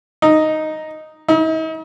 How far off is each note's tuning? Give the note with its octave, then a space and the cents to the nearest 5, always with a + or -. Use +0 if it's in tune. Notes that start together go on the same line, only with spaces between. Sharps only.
D#4 +0
D#4 +45